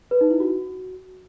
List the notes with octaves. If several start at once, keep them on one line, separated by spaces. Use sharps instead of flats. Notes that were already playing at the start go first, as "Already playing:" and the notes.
B4
D#4
E4
F#4